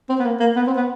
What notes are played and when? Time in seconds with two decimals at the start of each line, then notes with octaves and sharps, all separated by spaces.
0.09 C4
0.19 B3
0.25 A#3
0.40 A#3
0.56 B3
0.67 C4
0.77 B3